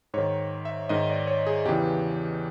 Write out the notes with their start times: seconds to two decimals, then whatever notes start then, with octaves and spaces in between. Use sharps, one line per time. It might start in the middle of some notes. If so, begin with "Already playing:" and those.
0.14 G#2 D#3 C#5
0.65 E5
0.89 G#2 D#3 D#5
1.09 D5
1.27 C#5
1.47 G#4
1.65 E2 C#3 E3 G4